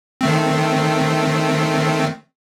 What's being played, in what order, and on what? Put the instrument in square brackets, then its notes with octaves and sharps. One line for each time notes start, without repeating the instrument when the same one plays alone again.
[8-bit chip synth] D#3 A3 C4